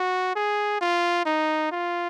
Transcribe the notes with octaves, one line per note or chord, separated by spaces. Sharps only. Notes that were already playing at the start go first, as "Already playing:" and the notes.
Already playing: F#4
G#4
F4
D#4
F4